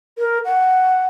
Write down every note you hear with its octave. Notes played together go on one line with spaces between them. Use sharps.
A#4
F#5